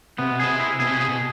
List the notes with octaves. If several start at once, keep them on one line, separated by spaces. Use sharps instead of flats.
C3 B3
B2
C3 G#4
E4
B2 G#4
C3
B2
C3 G#4
B2